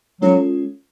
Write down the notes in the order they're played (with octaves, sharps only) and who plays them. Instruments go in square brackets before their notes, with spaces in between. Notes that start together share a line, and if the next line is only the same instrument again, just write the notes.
[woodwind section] F#3 [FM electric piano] G#3 C#4 F4 A4 C#5